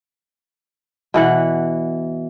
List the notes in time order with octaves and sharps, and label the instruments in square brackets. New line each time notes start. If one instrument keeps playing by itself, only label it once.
[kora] B2 E3 F#5